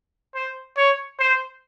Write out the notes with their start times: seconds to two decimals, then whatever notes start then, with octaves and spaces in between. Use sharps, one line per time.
0.35 C5
0.77 C#5
1.19 C5